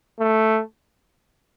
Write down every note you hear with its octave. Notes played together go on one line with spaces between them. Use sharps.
A3